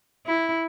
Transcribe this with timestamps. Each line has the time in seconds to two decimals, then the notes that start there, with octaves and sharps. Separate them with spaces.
0.26 E4